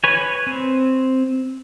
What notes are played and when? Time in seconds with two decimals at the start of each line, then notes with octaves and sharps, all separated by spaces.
0.04 B4 C#5 G#5
0.47 C4